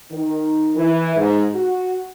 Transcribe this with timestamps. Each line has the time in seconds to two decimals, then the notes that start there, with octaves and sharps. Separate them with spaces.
0.12 D#3
0.77 E3
1.17 G#2
1.55 F#4